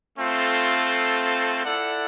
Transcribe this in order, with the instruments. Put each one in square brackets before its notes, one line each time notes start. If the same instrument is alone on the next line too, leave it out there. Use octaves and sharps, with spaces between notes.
[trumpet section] A3 C4 F4 A4
E4 A4 D5 F#5